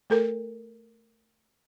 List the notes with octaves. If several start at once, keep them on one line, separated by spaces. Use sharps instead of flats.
A3 A4 A#4